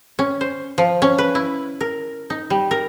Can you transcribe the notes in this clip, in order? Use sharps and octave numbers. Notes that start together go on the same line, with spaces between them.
C#4
C5
F3
C#4
B4
E4
A#4
D#4
G3
A#4